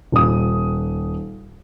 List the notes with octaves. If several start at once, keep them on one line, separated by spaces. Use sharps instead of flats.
D#1 D#6